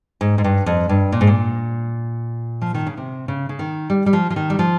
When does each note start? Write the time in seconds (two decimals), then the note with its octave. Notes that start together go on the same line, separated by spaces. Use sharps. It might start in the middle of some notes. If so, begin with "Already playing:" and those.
0.21 G#2
0.38 G#2
0.44 G2
0.66 F2
0.89 G2
1.12 A#2
1.21 G#2
1.27 A#2
2.62 F3
2.74 D#3
2.86 C#3
2.97 C3
3.28 C#3
3.49 C#3
3.59 D#3
3.90 G3
4.06 G3
4.13 F3
4.30 F3
4.36 D#3
4.50 G3
4.59 F3